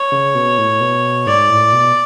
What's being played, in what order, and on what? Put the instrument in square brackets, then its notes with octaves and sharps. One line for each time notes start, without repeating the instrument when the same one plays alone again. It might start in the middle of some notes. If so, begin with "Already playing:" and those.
Already playing: [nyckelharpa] C#5
[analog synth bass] C#3
B2
A2
B2
[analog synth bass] G#2 [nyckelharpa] D5
[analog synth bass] A2
B2